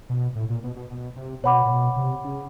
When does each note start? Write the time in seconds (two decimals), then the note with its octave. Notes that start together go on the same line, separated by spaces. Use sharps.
0.09 B2
0.35 A2
0.50 A#2
0.63 B2
0.76 B2
0.90 B2
1.16 C3
1.43 B2 C#5 F#5 B5 D6
1.65 A#2
1.70 B2
1.96 C3
2.24 C#3